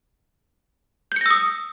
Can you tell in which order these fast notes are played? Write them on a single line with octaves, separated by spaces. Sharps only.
G6 C#7 A#6 E6 D#6